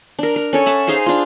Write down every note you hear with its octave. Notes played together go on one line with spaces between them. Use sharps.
D4 A#4
A#4
C#4 A4 C#5
E5 F#5 A5
D#4 G#4 C5 F5
D4 F4